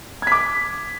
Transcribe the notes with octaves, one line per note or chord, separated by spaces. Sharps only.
D6 G#6 B6